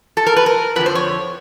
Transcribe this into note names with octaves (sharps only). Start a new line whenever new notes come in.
A4
A#4
B4
A#4
F2 D3 F3 B4
C5
C#5